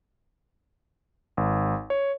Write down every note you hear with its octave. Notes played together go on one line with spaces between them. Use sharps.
G#1
C#5